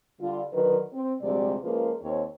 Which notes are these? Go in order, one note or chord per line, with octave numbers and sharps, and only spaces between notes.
D3 G3 F4
D3 D#3 F#3 B4
C4
D2 C3 F3 G3 G#3 D5
F3 G#3 A#3 C#4 F4 B4
D#2 C4 C#5